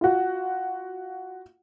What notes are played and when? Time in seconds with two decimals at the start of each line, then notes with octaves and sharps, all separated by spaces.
0.01 F4 F#4